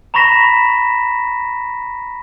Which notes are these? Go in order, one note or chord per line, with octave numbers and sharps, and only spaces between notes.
A#5 B5 C#6 A#6 B6 E7